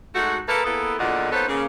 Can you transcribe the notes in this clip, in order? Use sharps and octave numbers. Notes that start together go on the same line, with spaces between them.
G#3 A3 D#4 F#4
A#3 A4 B4
A#3 B3 E4 G#4 A4
E2 A#2 D3 D5 D#5 F#5
A#3 B3 D#4 A4 C5 C#5
C#3 A#3